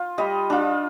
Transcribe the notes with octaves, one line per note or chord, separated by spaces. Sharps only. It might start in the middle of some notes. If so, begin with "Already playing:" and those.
Already playing: F4
G3 D#5
D4 F4